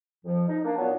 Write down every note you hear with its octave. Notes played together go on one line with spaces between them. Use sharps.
F2 F3
D#4
A#3 D4
A#2 F#3 B3